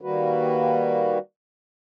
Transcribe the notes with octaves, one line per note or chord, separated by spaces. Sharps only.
D#3 G3 A#3 F#4 B4